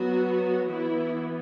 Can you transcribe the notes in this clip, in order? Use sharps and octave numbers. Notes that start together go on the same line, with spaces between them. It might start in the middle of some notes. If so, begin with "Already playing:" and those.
Already playing: F#3 B3 F#4
E3 B3 E4